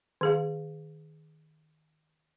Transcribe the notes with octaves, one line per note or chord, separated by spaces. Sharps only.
D#3 G#4 F5